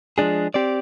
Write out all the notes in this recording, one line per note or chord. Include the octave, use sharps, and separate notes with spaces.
F3 G#3 D4 G#4
C4 G4 D5